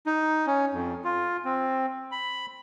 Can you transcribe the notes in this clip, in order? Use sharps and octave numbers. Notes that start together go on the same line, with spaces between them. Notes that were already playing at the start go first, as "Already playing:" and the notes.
D#4
C#4
F2
F4
C4
B5